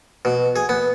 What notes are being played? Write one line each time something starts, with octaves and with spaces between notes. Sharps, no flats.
B2
G#4
B3